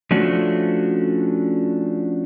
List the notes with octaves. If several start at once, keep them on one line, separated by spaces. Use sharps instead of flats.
F3 A3 C#4 D4 F#4